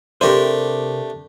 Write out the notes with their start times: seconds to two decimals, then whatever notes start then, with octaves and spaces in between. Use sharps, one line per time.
0.21 C3 A3 D4 G4 A#4 C5